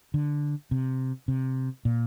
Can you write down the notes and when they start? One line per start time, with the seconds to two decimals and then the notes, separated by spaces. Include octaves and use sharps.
0.14 D3
0.71 C3
1.28 C3
1.85 A#2